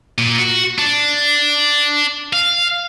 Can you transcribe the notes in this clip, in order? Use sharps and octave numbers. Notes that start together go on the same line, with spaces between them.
A#2
F#4
D4
F5